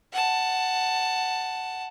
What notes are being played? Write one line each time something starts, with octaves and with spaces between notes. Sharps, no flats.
F#5 A5